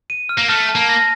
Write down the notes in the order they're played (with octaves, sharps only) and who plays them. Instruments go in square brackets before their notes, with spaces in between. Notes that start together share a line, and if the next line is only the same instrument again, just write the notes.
[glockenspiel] D#7
F6
[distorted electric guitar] A#3
[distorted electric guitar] A3 [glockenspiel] F6
[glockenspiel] A5
[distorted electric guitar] A#3
[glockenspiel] A#6